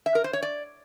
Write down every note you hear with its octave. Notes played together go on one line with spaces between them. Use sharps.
E5
A#4
C5
C#5
D5